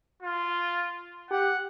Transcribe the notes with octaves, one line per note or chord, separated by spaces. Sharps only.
F4
G4 F#5